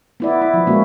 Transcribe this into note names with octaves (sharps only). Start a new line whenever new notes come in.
B3 E4 D5
E4
F3
A#2 G#3 A#3 C#4 F#4